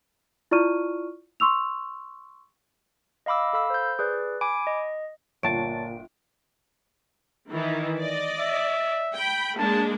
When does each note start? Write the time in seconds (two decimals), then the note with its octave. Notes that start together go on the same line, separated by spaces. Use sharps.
0.51 E4 F4 D5 C#6 F6 D#7
1.40 C6 C#6 E6 F7
3.26 D#5 F5 B5 D6 E6
3.53 A4 F5 B5 E6
3.70 C5 G6
3.99 G#4 B4 D5
4.41 G#5 B5 D6 D7
4.67 D#5
5.43 G1 A#2 F4 C#5 G5 A5 A6 D7
7.49 D#3 E3
8.01 D5 D#5
8.40 E5
9.15 G5 B5
9.58 G#3 A#3 D4 A5